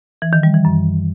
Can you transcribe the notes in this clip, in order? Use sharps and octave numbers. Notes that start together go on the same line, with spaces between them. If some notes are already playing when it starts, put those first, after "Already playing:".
E3
D#3
G3
E3
F#2